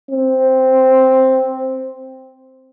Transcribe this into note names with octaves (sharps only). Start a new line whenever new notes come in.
C4